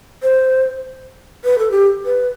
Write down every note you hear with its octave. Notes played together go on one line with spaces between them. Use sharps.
C5
B4
A4
G4
B4